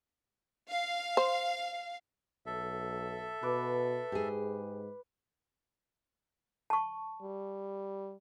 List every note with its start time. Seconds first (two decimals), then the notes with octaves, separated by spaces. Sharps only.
0.69 F5
1.17 C5
2.46 B1 A4 E5
3.43 B2 B4 D6
4.12 G#2 G4 G#4
6.70 A5 C#6
7.21 G3